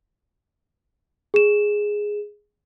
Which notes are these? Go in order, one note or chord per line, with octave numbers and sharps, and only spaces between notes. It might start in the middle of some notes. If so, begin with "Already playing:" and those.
G#4 E7